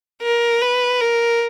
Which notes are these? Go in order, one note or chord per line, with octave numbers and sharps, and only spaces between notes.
A#4
B4
A#4